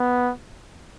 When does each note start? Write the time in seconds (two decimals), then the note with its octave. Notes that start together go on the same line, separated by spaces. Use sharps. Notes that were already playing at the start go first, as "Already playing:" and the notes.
Already playing: B3